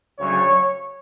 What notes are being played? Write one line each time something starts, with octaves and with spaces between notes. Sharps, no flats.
D2 C#3 F#3 C#5